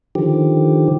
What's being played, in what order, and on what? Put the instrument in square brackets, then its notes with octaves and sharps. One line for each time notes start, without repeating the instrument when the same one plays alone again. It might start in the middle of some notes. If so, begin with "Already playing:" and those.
[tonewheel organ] D3 D#3 F3 G4